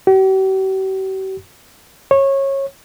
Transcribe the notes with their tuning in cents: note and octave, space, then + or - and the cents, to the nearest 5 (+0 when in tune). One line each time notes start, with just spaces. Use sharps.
G4 -45
C#5 -20